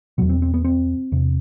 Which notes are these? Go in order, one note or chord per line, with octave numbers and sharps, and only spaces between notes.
E2 B2 F#3
C4
C4
B3
C4
E2 C3